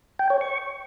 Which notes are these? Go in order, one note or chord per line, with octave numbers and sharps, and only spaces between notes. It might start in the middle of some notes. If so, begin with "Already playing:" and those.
G5
C#5
C#6